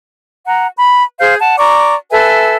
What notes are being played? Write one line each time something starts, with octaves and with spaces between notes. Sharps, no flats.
F#5 A#5
B5
G#4 C5 F5 G6
F#5 A5
D5 A#5 C#6 D6
A4 B4 E5 G#5